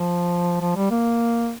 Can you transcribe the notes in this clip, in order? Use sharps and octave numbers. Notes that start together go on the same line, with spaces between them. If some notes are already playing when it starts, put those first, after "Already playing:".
Already playing: F3
F3
G3
A#3